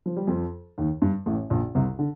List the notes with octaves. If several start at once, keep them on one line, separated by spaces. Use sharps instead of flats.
F3
G3
F2 F3
D#2 D#3
G2
A1 A2
A#1 A#2
C2 C3
D3